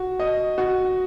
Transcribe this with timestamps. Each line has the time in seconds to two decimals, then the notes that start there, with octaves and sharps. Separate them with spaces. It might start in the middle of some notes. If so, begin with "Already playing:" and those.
Already playing: F#4
0.19 D#5
0.58 F#4